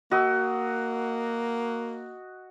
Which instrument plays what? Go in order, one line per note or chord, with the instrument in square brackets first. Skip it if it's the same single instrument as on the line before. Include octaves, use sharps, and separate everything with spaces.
[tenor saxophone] A#3 [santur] F#4 D#5 E6